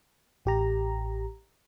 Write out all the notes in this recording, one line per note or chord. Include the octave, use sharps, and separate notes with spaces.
A1 G4 A#5